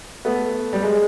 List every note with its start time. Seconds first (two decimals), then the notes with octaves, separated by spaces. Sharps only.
0.25 A3 B3
0.73 G3
0.83 G#3